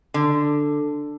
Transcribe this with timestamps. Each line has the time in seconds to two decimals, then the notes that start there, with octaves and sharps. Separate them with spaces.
0.14 D3